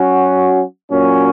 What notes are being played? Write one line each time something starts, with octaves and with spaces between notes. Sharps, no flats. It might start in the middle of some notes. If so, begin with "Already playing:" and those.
Already playing: F#3 C#4 F#4
A#2 F#3 C#4